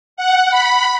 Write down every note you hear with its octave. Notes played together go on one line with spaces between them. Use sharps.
F#5
B5